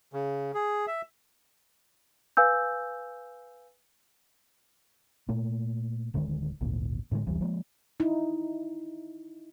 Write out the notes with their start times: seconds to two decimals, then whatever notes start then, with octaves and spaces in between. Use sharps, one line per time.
0.13 C#3
0.54 G#4
0.87 E5
2.37 B4 F5 G#5 E6 G6
5.29 A#2 A3 A#3
6.14 D1 D3 D#3 G#3
6.61 G#1 D2 A#2
7.12 A2 D3 D#3 G#3
7.27 F1 C#2 E3 G3
7.41 F3 G#3 A#3
8.00 D#4 E4